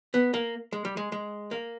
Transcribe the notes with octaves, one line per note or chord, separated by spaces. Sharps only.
B3
A#3
G#3
G3
G#3
G#3
A#3